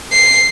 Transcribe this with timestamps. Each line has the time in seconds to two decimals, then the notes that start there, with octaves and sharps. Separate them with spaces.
0.12 C7